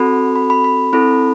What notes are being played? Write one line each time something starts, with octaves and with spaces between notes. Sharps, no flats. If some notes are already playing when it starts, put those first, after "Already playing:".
Already playing: C4 F#4 A4 B5
B5
B5
B5
C4 E4 A4 B5